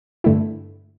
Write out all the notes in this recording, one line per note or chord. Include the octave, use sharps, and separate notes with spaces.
G2 D3 A3 E4